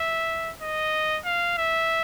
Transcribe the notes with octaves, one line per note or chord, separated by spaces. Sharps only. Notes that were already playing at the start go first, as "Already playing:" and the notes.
Already playing: E5
D#5
F5
E5